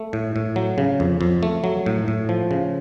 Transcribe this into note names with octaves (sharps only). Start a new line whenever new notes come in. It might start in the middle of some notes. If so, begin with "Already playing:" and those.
Already playing: A3
A2
A2
F#3
C#3
F2
F2
A3
F#3
A2
A2
F3
C#3